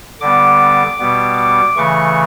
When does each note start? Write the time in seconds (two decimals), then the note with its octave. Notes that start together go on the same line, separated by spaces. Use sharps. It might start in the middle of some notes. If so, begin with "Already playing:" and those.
0.21 D3 G3 B3 D6
0.99 B2 G3 B3
1.38 D6
1.76 C#3 E3 A3 C#6